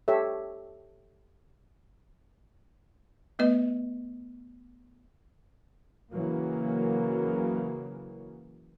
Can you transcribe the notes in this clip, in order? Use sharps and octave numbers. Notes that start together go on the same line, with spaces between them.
G4 A4 C#5 E5
A3 B3 B4 D#5
C#3 E3 F#3 A#3